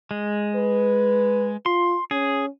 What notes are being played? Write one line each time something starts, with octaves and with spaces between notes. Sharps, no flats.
G#3
B4
F4 C6
C#4 G#4